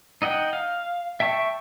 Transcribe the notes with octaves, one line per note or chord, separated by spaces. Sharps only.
D#4 D#5 F#5 G5
F5
E5 G5 A5 C#6